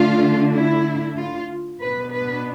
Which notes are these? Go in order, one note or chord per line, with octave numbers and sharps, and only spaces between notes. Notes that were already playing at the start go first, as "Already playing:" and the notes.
Already playing: D3 A3 D4 F4
E4
F4
B2 B3 D4 B4
B4